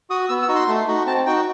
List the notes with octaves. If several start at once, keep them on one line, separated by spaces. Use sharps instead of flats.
F#4 D#6
B3 E6
E6
D#4 F#4
C6
A3
D#4 F#4
C4 A5
D#4 F#4 G5